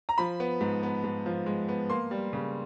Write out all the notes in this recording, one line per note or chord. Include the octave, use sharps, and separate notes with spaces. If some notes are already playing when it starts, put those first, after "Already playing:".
A#5
F3 B5
B3
G#2
B3
G#2
F3
G#3
B3
A#3 C6
G3
C#3